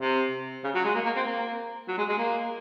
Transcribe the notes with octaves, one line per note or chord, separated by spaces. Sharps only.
C3
C#3
F#3
G#3
A#3
A#3
C4
A#3
F#3
G#3
G#3
A#3